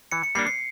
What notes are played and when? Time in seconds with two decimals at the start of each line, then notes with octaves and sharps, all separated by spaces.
0.12 E3 C#7
0.23 C#7
0.35 G3 A#3 D4 C7
0.47 C7